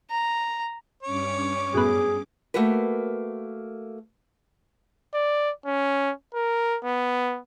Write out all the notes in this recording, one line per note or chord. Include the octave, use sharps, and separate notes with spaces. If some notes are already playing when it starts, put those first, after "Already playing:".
A#5
G2 C#4 C#5 D6
F#2 A2 B3 G#4
A3 A#3 F#4 A#4 B4
D5
C#4
A#4
B3